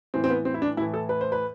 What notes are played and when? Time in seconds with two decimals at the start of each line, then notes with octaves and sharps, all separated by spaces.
0.14 A2 E3 C4
0.24 C4
0.30 B3
0.45 C4
0.54 E4
0.62 D4
0.77 A2 E4
0.81 E3
0.94 A4
1.09 B4
1.21 C5
1.32 B4